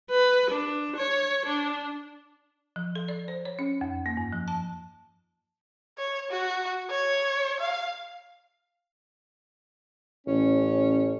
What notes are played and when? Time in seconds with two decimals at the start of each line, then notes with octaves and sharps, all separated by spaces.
0.11 B4
0.51 D4
0.97 C#5
1.46 D4
2.76 F3
2.95 A4
3.08 D5
3.28 C5
3.45 C#5
3.59 C#4
3.81 F2
4.06 A#3
4.17 G2
4.33 F3
4.48 A5
5.98 C#5
6.31 F#4
6.90 C#5
7.60 F5
10.27 A1 C#4